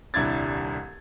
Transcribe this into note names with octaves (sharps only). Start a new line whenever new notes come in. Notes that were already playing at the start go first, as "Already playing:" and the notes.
D#1 C2 D4 E4 G#6 A6